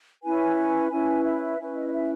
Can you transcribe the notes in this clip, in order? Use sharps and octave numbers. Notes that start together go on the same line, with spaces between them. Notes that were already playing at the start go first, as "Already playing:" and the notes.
C#4 E4 B4 G#5
G#5
C#4 E4 B4 G#5
E5
C#4 E4 B4
D#5
D#5
E5